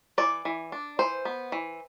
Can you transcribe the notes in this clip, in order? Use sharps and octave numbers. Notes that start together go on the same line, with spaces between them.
E3 D5
E3
D4
E3 C5
B3
E3